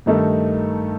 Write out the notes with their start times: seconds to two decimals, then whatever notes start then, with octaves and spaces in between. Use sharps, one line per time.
0.06 G2 D#3 A3 D#4 A4